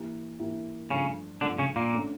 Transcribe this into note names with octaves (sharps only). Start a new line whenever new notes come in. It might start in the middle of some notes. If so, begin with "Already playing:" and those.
Already playing: E3 A#3 E4 G4
E3 A#3 E4 G4
G2 C#3 F3 A3 C#4
G2 D3 F3 A3 D4
C#3 C#4
A#2 A#3
D3 A3 C#4